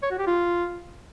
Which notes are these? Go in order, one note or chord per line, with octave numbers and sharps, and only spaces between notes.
C#5
F#4
G4
F4